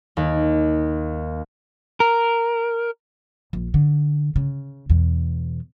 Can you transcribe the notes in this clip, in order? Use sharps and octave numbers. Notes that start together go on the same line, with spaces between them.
D#2
A#4
A#1
D3
C#3
E2 B2